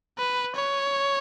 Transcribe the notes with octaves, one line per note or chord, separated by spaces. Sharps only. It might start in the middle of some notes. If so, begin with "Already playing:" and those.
B4
C#5